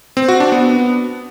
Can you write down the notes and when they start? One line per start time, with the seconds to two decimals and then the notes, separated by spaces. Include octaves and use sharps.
0.17 C4
0.28 F#4
0.40 D4
0.52 B3